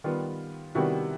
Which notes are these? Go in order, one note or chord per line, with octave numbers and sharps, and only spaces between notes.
D#3 G3 B3 F4
C3 D#3 G3 B3 E4 F#4